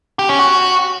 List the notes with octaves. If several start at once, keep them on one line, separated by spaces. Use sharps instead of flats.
G4
C#4
F#4